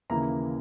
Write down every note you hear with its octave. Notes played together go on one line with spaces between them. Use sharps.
D#2 C#3 E3 A#3 E4 A#5